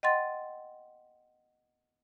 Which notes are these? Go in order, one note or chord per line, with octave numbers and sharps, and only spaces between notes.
D#5 F#5 G5 C6 A6